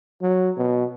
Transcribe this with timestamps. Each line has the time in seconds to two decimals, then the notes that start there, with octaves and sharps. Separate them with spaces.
0.22 F#3
0.58 B2